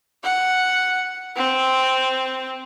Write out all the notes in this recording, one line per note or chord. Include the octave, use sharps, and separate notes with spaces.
F#5
C4